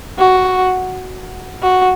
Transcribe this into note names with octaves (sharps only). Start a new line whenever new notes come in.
F#4
F#4